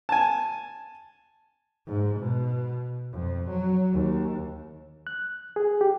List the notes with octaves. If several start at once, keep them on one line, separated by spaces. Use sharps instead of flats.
G#5 A5
G#2
B2
F2
F#3
D#2
F#6
G#4
G4